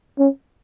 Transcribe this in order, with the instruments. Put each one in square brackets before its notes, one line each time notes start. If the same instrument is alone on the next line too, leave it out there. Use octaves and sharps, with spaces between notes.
[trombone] C#4